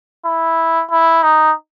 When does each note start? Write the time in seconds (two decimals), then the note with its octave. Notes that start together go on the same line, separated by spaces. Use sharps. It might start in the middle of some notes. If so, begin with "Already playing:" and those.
0.26 E4
0.91 E4
1.23 D#4